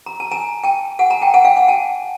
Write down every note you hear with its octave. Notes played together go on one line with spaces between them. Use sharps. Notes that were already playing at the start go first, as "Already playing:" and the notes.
A#5
A5
G#5 A#5
G5 A5
F#5 G#5
G#5 A#5
G5 A5
F#5 G#5
F5 G5
F#5 G#5
G5 A5